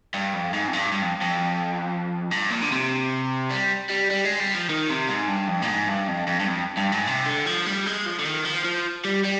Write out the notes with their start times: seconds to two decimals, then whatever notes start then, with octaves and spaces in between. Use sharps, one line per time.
0.14 G2
0.34 F2
0.53 G#2
0.68 F2
0.73 G2
0.92 G2
1.02 F2
1.22 F2
2.31 G2
2.51 A#2
2.62 D3
2.72 C3
3.50 G3
3.89 G3
4.10 G3
4.25 G#3
4.40 G3
4.55 F3
4.69 D#3
4.89 C3
5.09 G#2
5.29 G2
5.49 F2
5.62 A#2
5.69 G#2
5.89 G2
6.08 F2
6.27 F2
6.40 G2
6.47 F2
6.77 G2
6.92 G#2
7.07 C3
7.26 D3
7.46 F3
7.66 G3
7.86 G#3
8.06 F3
8.19 D3
8.25 D#3
8.45 F3
8.65 F3
9.05 G3
9.24 G3